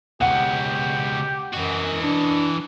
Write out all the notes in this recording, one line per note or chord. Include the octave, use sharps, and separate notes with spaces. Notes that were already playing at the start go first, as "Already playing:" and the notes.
C#2 B2 G4 F#5
F#2 E3 F#4 D#5
D4